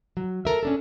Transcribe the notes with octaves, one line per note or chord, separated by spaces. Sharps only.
F#3
A4 A#4 E5
C#4 D4 A4